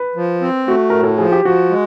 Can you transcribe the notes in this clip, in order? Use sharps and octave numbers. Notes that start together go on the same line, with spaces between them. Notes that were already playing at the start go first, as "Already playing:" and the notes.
Already playing: B4
F3
C4
A3 F#4
A2 A#4
A4
F3 G#4
G4
F3 F#4
G#3